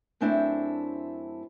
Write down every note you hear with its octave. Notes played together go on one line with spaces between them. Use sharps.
F#2 A3 C4 D4 E4 C5